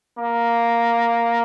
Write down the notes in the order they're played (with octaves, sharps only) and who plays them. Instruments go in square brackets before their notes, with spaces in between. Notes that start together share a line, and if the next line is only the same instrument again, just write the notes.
[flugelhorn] A#3